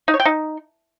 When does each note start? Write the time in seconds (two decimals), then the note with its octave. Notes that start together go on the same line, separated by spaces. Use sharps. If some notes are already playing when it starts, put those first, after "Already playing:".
0.08 D#4
0.14 C#5
0.20 G5
0.25 D#4